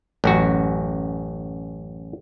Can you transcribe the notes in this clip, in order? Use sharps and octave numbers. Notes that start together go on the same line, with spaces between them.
A1 F#2 F#4